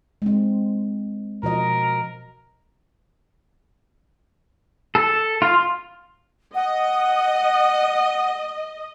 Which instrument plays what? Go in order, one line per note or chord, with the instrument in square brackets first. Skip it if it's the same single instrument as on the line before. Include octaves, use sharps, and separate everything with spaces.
[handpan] G#3 C4
[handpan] B2 F3 D#5 [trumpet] A#4
[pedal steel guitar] A4
F4
[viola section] D#5 [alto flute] F#5